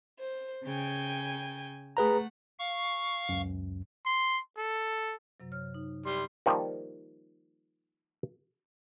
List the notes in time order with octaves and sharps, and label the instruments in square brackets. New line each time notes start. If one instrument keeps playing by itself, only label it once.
[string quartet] C5
C#3 G5 G#5
[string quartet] A3 F#5 [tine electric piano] G#4 B4 A#5
[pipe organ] F5 C#6
[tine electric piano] C#2 F#2
[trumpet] C6
A4
[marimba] F#2 C3 F#3
C#5 F6
D#4
[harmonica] G3 C6
[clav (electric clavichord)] D#3 F3 G3 A#3 D#4